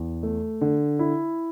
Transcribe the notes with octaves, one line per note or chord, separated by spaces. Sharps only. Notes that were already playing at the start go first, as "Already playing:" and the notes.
Already playing: E2
A3
D3
E4